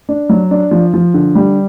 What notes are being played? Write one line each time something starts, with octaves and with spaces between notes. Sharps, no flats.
D4
F#3
D4
F3
F3
D3
G3